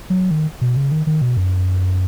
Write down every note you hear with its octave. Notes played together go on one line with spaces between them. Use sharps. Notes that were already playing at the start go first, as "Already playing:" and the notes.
F#3
D#3
B2
C#3
D#3
D#3
B2
F#2